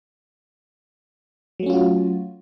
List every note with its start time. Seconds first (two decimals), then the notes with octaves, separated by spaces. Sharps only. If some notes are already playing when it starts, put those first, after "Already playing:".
1.59 F#3
1.63 A3
1.66 C#4
1.70 F4
1.73 F#4